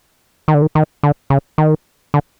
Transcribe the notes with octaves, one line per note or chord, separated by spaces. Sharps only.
D#3
D3
D#3
D#3
D3
C#3
D#3
D3